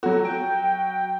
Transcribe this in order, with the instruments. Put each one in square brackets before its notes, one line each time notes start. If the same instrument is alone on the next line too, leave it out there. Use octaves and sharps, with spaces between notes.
[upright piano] F#3 F#4 [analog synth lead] A4
[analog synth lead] G5